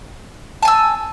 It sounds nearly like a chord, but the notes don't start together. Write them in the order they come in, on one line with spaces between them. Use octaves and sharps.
A5 G#5 E6